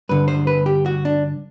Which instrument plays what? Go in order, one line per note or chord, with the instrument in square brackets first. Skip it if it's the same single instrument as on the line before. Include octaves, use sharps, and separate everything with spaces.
[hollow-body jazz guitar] G2 D3 B4
C5
B4
G4
F#4
D4